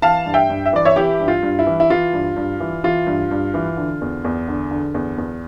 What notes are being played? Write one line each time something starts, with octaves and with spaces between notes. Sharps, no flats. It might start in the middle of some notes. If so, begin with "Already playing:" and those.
E3 F5 A5
G2
E5 G5
G2
E5
E3 D5
C#5 E5
E3 E4 G4
G2
F4
G2
E4
E3
E4
E3 F4
G2
G2
E3
E3 F4
G2
G2
E3
D3
E2
E2
D3
D3
E2
E2